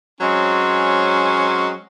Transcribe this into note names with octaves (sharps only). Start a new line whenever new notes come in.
F#3 G#3 C4 C#4